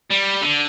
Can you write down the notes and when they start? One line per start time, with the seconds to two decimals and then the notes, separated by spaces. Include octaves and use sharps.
0.10 G3
0.41 D3